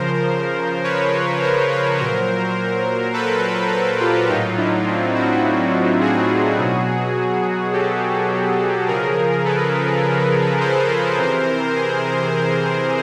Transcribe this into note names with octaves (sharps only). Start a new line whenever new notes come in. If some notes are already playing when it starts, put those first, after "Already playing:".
Already playing: C#3 F3 A#4 C5
B4 C#5
A#4 C5
B4 C#5
A#2 F#3 A#4 C5
A4 B4
A4 B4
F4 G4
A2 F#3 D#4 F4
D4 E4
C4 D4
E4 F#4
F#4 G#4
B2 F#3
G4 A4
C#3 F3 G#4 A#4
A4 B4
A#4 C5
C3 E3
G#4 A#4